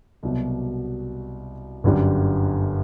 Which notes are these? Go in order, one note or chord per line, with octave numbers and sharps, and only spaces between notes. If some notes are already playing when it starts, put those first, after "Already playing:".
C2 B2 F#3
G1 F#2 D3 G3